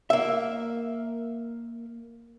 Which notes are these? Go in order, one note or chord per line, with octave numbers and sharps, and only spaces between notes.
A#3 E5